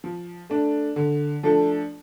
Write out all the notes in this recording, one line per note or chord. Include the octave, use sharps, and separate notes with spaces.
F3
A3 D4
D3
F3 A3 D4 A4